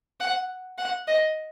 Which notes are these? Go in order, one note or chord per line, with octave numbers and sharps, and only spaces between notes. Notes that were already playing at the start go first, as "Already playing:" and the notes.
F#5
F#5
D#5